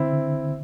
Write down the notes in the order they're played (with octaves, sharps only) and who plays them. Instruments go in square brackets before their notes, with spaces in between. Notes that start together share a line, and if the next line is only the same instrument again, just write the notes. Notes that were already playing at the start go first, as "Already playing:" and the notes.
Already playing: [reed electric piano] D3 [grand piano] C4 E4
[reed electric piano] D3